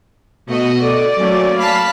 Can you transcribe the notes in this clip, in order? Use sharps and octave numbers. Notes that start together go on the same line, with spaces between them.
B2 A3 F#4 D#5
A4 D5
F#3 A3 A#3 C#4
F5 A5 B5 B6